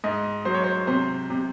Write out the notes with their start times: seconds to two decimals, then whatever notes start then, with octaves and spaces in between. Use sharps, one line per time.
0.04 G#2 D#5
0.45 F#3 C5
0.54 C#5
0.64 C5
0.87 C3 C5
1.30 C3